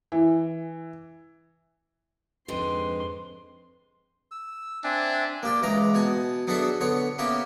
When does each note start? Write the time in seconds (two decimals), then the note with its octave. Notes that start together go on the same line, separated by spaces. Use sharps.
0.12 E3
2.48 F2 G#2 D3 G#3 C4 B4 C6
4.31 E6
4.84 C4 D4 E5 G#5
5.43 A#3 G4 D5
5.63 C#2 E3 G#3 A#5 D6
5.94 B2 G#5 A5
6.47 F#3 B3 D4 G#4 A4 E5
6.81 D3 B3 C#5
7.18 A#3 B3 C#4 G4 E5